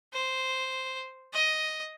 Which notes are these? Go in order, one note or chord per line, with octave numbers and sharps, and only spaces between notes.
C5
D#5